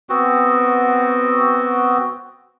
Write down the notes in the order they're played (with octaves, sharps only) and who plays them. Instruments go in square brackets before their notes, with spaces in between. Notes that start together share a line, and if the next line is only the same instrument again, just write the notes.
[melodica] B3 C4 F#4